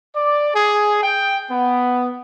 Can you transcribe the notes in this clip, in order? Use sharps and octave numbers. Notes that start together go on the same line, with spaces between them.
D5
G#4
G5
B3